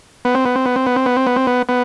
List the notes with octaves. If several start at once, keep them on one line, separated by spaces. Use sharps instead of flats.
B3
C4
B3
C4
B3
C4
B3
C4
B3
C4
B3
C4
B3
B3